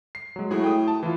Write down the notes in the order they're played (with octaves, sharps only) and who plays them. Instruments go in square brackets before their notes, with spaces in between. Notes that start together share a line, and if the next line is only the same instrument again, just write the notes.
[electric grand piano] C7
F#3 G#3
[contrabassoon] A2 [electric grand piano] A3 F#4 G#4
[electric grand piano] G5 D#6
A5
E3 F4